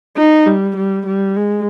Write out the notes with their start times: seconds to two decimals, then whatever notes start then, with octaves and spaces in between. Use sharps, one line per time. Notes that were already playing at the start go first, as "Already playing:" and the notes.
0.17 D#4
0.46 G3
0.76 G3
1.06 G3
1.36 G#3